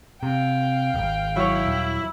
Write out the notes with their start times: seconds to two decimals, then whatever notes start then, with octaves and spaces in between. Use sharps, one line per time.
0.23 C3 F5 G5
0.94 D#1 G#1
1.36 F#3 E4 C#5
1.66 D#1